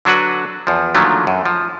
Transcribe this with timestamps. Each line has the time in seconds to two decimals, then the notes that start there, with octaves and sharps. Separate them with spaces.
0.05 D3 F#3 D4 F#4 B4
0.67 E2 F3
0.95 A#2 D3 D#3 F3 F#3 A3
1.27 F#2
1.45 F3